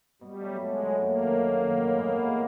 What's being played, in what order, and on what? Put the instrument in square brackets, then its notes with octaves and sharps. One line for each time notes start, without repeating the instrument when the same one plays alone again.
[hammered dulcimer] B2 [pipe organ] G3
[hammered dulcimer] F#3 A3
[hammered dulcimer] B2 [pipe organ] G#3
[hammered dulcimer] F#3 A3
[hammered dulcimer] F#2 [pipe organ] A#3
[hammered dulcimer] D#3 F#3
F#2
D#3 F#3
A2
E3 G#3 B3
A2